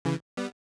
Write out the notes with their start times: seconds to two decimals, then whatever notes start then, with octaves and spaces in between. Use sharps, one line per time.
0.05 C#3 E3
0.37 G3 B3